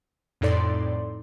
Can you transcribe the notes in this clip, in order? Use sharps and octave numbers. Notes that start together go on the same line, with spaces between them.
F2 A2 D#4 A4 D5 C6